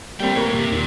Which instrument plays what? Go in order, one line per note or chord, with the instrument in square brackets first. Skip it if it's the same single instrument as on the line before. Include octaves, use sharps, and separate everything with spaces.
[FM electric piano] G3 A#3 C4 [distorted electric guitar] A3 G5
[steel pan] A#3 G4 A#4 [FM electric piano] B4 C#5
[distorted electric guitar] C3
[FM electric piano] D#2 [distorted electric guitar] A#2